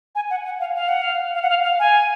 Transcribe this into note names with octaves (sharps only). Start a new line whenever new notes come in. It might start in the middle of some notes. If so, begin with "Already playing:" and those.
G#5
F#5
F#5
F5
F5
F#5
F5
F5
F#5
F5
F5
G#5